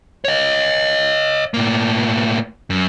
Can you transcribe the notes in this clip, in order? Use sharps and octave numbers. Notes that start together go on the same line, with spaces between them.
C#5 D#5
A2 A#3
F#2